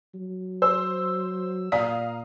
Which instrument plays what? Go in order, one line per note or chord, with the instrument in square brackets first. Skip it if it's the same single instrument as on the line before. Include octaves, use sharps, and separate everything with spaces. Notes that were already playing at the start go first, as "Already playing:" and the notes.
[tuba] F#3
[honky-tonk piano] C5 [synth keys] E6
[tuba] A#2 [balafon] D5 [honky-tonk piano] F5 A#5 D#6